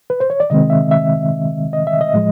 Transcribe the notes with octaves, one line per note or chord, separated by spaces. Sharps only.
B4
C5
C#5
D5
C3 D#3 G#3 C4 D#5
E5
E5
D#5
E5
D#5
A2 F3 G#3